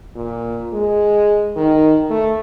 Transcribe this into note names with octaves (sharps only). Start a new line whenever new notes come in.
A#2
G#3
D#3
A3